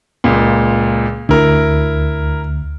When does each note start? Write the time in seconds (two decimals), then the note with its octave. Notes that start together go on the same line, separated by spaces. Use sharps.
0.24 C#2 A#2
1.29 D2 E4 A#4